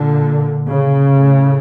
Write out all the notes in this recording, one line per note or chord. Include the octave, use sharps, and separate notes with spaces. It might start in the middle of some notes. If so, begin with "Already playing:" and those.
Already playing: A#2 D3
C#3
A2